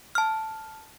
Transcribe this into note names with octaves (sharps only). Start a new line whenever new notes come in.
A5 F6